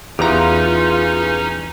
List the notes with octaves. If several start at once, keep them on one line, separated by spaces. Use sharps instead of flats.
E2 C#4 D#4 F4 G4 G#4 B4 A#5